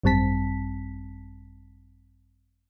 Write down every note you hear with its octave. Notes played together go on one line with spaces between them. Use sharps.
G#1 F#2 G3 C4 A5 B6